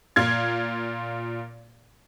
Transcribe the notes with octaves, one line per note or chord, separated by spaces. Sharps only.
A#2 F4 G#6